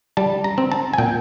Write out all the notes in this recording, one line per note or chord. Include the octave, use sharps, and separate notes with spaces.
G3 A5
A#5
C4
A5
G#5
A#2 G5